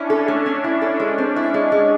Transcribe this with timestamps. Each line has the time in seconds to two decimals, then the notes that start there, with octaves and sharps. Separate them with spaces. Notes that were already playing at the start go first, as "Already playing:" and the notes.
Already playing: C#4 D4 E4
0.10 A4
0.28 A3 D4
0.46 C#4
0.64 E4
0.82 A4
1.00 G#3
1.18 C4
1.36 E4
1.54 G#3
1.72 G#3